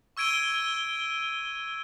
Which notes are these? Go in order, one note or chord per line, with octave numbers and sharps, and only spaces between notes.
C#6 E6 G#6 D7 D#7 G7